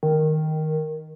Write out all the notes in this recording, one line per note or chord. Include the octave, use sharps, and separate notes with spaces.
D#3